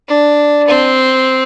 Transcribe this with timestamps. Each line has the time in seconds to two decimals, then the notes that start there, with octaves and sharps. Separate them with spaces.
0.08 D4
0.68 C4